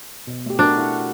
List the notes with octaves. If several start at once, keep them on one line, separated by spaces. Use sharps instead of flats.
B2
A3 G4
A3 D4 F#4 A#4
E4 F#5